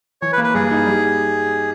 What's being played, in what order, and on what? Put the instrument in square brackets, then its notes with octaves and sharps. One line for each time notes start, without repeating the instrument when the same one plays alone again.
[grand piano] E3 [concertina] C#5
[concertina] B4
[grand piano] A#3
[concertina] B4
[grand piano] G2 [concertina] G#4
[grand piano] D#4
G3